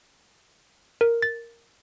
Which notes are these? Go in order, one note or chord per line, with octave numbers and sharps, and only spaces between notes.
A#4
A6